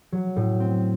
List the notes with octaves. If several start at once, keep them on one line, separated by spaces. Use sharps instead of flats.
F#3
A2
C4